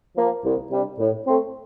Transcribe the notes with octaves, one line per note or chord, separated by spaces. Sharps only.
F3 A#3
C2
C3 G3 D4
A2
A3 C4